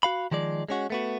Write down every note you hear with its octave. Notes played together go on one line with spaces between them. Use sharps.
F#4 F5 B5
D#3 F3 G#3 D5
G#3 C#4 F#4
A3 B3 F#4